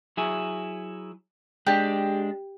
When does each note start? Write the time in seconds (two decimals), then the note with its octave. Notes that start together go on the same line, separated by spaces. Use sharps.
0.17 F#3 E4 G#4
1.67 G#3 D4 G4